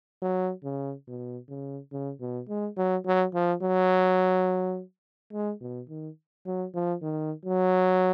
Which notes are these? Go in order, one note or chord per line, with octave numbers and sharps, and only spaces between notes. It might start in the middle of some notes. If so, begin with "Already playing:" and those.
F#3
C#3
B2
C#3
C#3
B2
G#3
F#3
F#3
F3
F#3
G#3
B2
D#3
F#3
F3
D#3
F#3